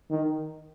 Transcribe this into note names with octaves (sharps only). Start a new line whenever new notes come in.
D#3